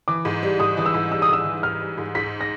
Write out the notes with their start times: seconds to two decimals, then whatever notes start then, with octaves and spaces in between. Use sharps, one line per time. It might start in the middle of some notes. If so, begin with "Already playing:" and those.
0.08 E3 D6
0.25 G#2
0.43 G3
0.60 G#2 D#6
0.77 E3 D#6
0.86 E6
0.94 G#2
1.11 G3 E6
1.22 D#6
1.29 G#2 E6
1.45 E3
1.63 G#2 F6
1.80 G3
1.98 G#2
2.15 G#2 B6
2.41 A#6